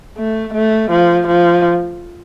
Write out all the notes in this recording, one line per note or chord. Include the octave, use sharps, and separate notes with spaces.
A3
A3
F3
F3